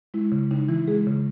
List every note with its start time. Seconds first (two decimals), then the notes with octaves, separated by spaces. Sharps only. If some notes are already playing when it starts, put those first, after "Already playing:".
0.14 G#3 E4
0.32 C#3
0.51 C#3 D#4
0.69 E3 E4
0.87 G#3 G#4
1.07 C#3